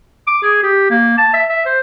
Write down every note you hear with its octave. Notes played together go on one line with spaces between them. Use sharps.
D6
G#4
G4
A#3
A5
E5
E5
C5